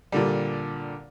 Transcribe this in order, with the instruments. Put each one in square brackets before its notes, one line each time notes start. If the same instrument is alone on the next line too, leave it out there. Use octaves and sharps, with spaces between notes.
[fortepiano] A#2 D3 G3